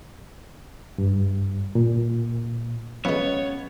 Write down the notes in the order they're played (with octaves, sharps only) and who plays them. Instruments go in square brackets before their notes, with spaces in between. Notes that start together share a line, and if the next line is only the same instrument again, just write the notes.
[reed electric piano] G2
A#2
[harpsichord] F3 G#3 [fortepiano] B3 [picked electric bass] C#4 [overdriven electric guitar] C#5